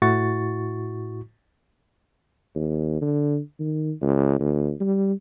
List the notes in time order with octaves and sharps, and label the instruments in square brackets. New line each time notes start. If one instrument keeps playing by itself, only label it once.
[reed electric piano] A2 E4 F#4 C#6 A6
[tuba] D#2
D3
D#3
C#2
D2
G3